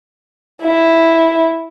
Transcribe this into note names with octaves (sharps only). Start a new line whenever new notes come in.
E4